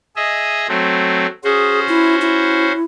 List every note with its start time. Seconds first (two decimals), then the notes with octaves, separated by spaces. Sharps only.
0.16 G#4 D#5 E5
0.68 F#3 A3 C4
1.44 C#4 F#4 G#4 C5
1.89 E4
2.22 E4